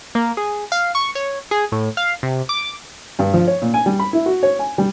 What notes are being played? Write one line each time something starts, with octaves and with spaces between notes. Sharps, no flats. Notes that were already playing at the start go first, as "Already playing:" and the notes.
A#3
G#4
F5
C#6
C#5
G#4
A2
F5
C3
D6
G2
F3
C#5
A#2
G#5
G3
B5
E4
F#4
C#5
G#5
G3